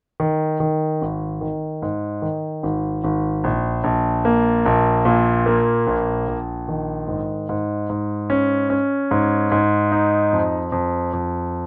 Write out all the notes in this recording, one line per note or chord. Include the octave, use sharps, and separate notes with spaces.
D#3
D#3
G#1
D#3
G#2
D#3
G#1
G#1
A#1
A#1
A#3
A#1
A#2
A#3
A#1
A#1
D#3
G#2
G#2
G#2
C#4
C#4
G#2
G#2
D#4
F2
F2
F2